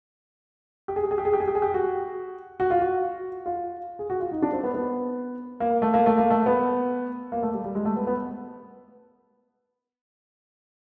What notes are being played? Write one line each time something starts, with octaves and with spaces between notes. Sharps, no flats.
G4
G#4
G4
G#4
G4
G#4
G4
G#4
G4
G#4
G4
F#4
F#4
F4
F#4
F4
G#4
F#4
F4
D#4
D4
C4
B3
B3
A#3
A3
A#3
A3
A#3
A3
B3
A#3
A3
G3
G3
G#3
A3
B3
B3